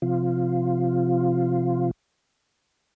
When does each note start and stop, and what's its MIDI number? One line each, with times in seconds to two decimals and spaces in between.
0.02 1.91 48
0.02 1.91 53
0.02 1.91 65